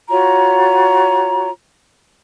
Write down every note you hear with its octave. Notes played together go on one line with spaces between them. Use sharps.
F4 F#4 C#5 A#5